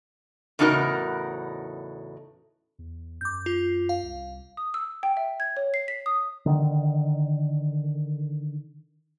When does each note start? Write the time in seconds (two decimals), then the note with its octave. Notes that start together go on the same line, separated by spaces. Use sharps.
0.59 E2 A2 C#3 D#4 F#4 A#4
2.79 E2
3.21 F#2 D6 G6
3.46 F4
3.89 F5
4.03 C2
4.57 D#6
4.74 E6
5.03 G5
5.17 E5
5.40 G#6
5.57 C#5
5.74 C7
5.88 B6
6.06 D#6
6.46 D3 D#3